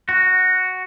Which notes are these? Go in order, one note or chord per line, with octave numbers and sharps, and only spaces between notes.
F#4